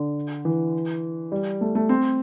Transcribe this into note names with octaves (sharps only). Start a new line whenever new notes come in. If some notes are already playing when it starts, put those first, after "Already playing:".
Already playing: D3
E3
G3
A3
A3
C4